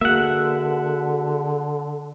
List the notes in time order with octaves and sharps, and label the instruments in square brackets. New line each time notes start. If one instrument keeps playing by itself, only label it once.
[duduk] D3 [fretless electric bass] A#3 [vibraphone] F#4 G#4 [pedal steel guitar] E5 F#5